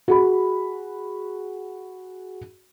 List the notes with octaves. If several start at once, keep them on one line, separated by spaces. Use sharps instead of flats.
F#4 G#4 B5